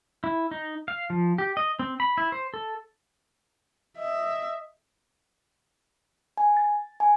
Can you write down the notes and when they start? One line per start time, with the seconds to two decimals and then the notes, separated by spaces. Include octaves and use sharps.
0.24 E4
0.51 D#4
0.88 F5
1.10 F3
1.38 G4
1.57 D#5
1.79 C4
2.00 B5
2.18 E4
2.32 C5
2.54 A4
3.98 D#5 E5
6.37 G#5
6.57 A6
7.00 G#5